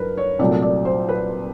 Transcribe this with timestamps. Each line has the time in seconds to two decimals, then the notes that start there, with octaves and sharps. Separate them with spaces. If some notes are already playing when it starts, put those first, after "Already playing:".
Already playing: G2 F#3 A#4 B4
0.18 C#5
0.39 C2 A#2 F#3 A3 D5
0.62 D5
0.85 C5
1.09 B4